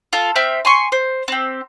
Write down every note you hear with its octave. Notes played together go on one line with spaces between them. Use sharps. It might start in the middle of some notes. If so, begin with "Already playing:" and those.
F4 A4
C4 E5 G5 F6
G#5 C6 C#6
C5
C4 G4